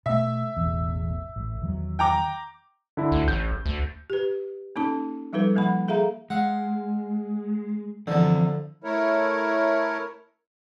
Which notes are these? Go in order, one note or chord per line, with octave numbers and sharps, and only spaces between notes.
B2 A3 E5
E1 A1 E2
A1
E2 D#3 F#3
G5 A#5 D6
D3 E4
D2
A1 G6
D2
G4 B4
A#3 C#4 D#4 A4 A5
F3 G3 D#4 A4 B4
F3 A#3 F#5 B5
G#4 A4 E5 F5 A#5
G#3 F5 F#5
D3 E3 F3 D5
A3 E4 A#4 C#5